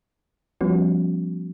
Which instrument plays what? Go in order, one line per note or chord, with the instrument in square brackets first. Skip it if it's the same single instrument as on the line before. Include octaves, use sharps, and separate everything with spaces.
[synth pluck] F3 G3 B3 C#4 F#4